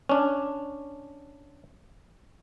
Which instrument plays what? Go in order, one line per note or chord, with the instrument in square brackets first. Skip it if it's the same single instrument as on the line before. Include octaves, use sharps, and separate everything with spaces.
[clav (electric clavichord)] C#4 D4